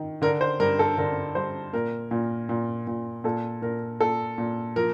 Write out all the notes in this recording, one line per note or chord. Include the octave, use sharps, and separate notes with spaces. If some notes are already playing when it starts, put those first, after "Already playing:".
Already playing: D#3
D3 A#4
C5
G2 A#4
A4
D3 A#4
G3 C5
A#2 A#4
A#2
A#2
A#2
A#2 A4
A#2 A#4
A#2 A4
A#2
F3 A#4